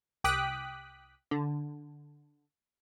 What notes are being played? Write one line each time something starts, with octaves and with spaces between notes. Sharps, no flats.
C2 G5 D6 D#6 F#6 B6
D3